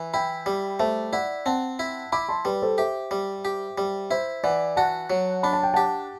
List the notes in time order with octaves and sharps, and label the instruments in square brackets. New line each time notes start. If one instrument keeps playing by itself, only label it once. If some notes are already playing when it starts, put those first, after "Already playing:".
Already playing: [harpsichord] E3
[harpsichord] E4 [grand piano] G5 B5
[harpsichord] G3
[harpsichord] A3 [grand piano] C5 E5
[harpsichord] E4 [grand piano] D5 F#5
[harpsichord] C4 [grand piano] F#5 A5
[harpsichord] E4
[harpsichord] E4 [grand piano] B5 D6
[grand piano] A5 C6
[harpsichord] G3 [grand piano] B4 D5
[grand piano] A4 C5
[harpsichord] G4 [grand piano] C5 E5
[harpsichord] G3
G4
G3
[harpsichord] E4 [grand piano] C5 E5
[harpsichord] E3 [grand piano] D5 F#5
[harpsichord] F#4 [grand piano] F#5 A5
[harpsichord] F#3
[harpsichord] D4 [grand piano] B5
[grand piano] A5
G5
[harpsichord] G4 [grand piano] F#5 A5